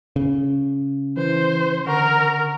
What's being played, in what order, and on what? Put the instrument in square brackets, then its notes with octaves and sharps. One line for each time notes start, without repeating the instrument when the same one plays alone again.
[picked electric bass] C#3
[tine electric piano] E3 [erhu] C5
[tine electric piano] D3 F#5 C#6 [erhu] A#4